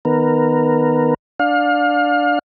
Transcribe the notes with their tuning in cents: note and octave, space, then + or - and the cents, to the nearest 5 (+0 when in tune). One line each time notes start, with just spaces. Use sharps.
D#3 +0 B3 +0 A#4 -10
D4 +0 F5 +30